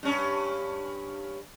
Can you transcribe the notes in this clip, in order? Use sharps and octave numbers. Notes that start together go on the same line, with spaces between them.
G2 C#4